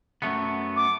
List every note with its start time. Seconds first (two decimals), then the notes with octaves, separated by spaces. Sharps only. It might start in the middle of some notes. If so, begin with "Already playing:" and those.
0.22 F#2 A3 B3
0.76 D6